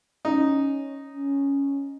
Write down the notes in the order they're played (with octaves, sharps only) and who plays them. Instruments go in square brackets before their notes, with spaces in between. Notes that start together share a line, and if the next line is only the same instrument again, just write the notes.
[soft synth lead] C#4 [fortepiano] D#4
[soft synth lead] C#4